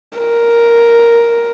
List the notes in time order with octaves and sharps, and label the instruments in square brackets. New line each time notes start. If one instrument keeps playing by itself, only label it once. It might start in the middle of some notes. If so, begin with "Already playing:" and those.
[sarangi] A#4